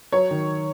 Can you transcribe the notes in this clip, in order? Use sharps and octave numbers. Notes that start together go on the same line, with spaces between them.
F#3 C#5
D#3